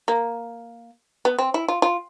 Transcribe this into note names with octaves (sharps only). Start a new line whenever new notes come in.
A#3
B3
C4
E4
F4
F4